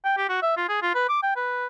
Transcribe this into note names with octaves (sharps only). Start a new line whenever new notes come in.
G5
G4
F#4
E5
F4
G#4
F4
B4
D6
G5
B4